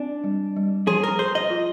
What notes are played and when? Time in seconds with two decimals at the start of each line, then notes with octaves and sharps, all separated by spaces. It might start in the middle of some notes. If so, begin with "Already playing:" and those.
Already playing: C4 D4
0.24 G3
0.57 G3
0.87 F3 G#4
1.03 A#4
1.19 G#4 C5
1.35 D#5
1.50 F4